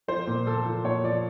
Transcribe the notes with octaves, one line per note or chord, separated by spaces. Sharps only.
F3 C5
A#2
F3 A4
F3
A#2 C#5
F3 D5